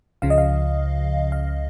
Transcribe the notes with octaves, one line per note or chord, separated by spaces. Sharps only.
C#2 C#3 F3 F5
D#5
F5
F5